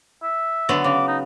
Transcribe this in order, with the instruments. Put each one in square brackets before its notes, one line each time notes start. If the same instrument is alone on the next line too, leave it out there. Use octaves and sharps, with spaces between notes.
[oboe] E5
[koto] D3 F#3 B3
[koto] C#3 [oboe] D6
[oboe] D#4